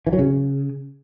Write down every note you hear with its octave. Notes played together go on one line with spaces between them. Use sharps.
E3
F#3
C#3